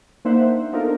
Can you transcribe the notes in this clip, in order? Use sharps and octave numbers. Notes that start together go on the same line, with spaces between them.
A#3 D4 D#4 C5 E5 F#5
B3 D4 D#4 F4 A4 A#4